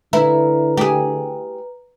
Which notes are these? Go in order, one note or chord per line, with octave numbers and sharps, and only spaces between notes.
D3 E4 B4 A#5
G4 G#4